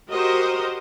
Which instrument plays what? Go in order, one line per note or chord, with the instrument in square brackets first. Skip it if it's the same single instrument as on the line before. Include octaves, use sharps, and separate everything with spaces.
[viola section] F#4 G4 A#4 C5 D#5